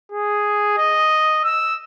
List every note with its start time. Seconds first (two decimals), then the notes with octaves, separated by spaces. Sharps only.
0.12 G#4
0.78 D#5
1.44 E6